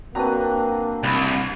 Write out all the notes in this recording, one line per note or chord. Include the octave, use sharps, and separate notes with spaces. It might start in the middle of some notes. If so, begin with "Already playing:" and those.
F#3 A#3 C4 D4 B4 A#5
C2 B5